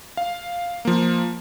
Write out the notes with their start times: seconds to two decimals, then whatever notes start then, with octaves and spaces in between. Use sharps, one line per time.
0.17 F5
0.85 F3 A#3